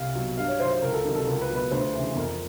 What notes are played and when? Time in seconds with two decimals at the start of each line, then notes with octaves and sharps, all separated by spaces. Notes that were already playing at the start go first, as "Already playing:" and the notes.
Already playing: C2 F5
0.15 B2 F#3
0.37 G2 F5
0.48 C#5
0.60 D#3 F#3 C5
0.72 C5
0.82 C#2 A#4
0.93 A4
1.05 C3 D#3 F#3 A#4
1.16 A4
1.27 C#2 A#4
1.41 B4
1.49 B2 F#3
1.56 B4
1.71 D2 C5
1.94 C#3 E3
2.15 F2 A#4